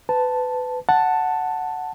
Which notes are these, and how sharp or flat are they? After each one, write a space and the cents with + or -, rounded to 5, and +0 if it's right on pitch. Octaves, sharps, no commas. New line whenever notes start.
B4 +25 A5 +0
F#5 +0 A5 +5